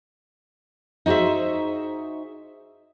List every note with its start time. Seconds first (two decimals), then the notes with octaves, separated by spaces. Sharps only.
1.06 D#4 F#4 G#4 C5 E5